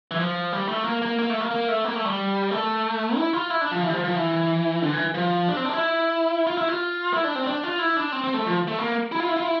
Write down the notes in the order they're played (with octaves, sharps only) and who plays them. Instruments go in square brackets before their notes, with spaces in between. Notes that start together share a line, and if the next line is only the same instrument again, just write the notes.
[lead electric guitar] E3
F3
G3
A3
A#3
A#3
A#3
A3
A#3
A#3
A3
A#3
A3
G3
A3
E4
F4
E4
D4
F3
E3
G3
F3
F3
E3
D3
E3
F3
D4
C4
D4
E4
F4
E4
F4
E4
D4
C4
D4
F4
E4
D4
C4
C4
A3
F3
A3
A#3
E4
F4
E4
F4
E4